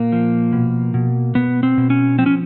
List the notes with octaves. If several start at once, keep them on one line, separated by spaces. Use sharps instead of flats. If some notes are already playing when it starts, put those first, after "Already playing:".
Already playing: A#2 A#3
F3
B2
B2
B2 B3
C4
B2
C#4
F3 C4
C#4